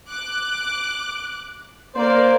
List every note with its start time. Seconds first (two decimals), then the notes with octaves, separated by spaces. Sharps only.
0.11 D6 F#6
1.95 A#3 C5 D5